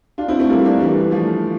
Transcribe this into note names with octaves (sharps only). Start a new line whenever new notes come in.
D4 F4
C4 E4
A3 C4
G3 A#3
A#3 D4
E3 G3
F3 A3